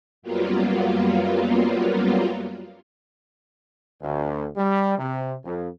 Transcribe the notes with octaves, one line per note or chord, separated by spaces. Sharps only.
F#2 F#3 G3 A#3 B3 F4
D2
G3
C3
F2